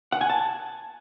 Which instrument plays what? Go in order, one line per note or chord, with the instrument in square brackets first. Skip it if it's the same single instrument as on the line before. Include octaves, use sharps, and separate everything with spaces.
[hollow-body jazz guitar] F#5
G#5
A5